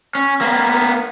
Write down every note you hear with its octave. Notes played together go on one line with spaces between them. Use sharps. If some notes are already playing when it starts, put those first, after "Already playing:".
C#4
A#3 B3